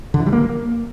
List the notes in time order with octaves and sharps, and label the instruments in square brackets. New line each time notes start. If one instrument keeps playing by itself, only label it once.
[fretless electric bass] D3
E3
G3
A#3